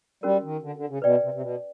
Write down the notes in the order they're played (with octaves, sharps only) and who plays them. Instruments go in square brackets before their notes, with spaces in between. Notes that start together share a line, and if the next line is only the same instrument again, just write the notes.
[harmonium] G3 [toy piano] C#4 F#4 A#4
[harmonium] D#3
D3
D3
C#3
[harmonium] B2 [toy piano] B4 D5 G5
[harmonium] C3
C3
B2